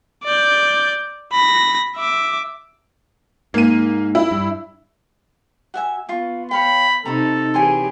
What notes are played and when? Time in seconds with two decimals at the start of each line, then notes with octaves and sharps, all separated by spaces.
0.24 D5 G6
1.32 B5 A#6
1.97 E5 D6
3.54 G#2 A#3 D#7
4.15 E4
4.31 G2
5.74 F#4 E5 G#5
6.09 B3 F4 C#6
6.51 C#5 F5 G5 B5
7.05 C3 D#4 A4 A#5 B5 C#6
7.54 E3 G4 G#4 C#5 G#5 C6